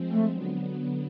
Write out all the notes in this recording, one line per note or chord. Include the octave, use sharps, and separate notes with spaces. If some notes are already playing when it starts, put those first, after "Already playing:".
Already playing: F3 G#3 C4
A3
D3 F#3 B3